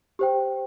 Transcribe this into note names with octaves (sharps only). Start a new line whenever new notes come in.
G4 C5 G5